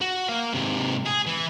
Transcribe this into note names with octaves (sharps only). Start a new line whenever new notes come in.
F#4
A#3 F5
G#2 C3
G#4
E3